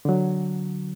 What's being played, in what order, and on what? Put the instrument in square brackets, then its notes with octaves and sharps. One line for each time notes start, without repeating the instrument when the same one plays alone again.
[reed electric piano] D3 F#3